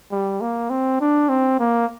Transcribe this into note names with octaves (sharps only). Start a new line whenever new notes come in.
G3
A#3
C4
D4
C4
A#3